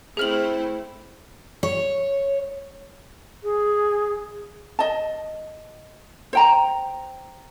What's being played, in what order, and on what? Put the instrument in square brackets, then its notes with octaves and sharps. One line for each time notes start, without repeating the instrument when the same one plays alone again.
[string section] A3 E4 [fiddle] C4 [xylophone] G#4 F6 F#7
[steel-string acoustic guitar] C#5
[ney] G#4
[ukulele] D#5 A5
C5 G5 A#5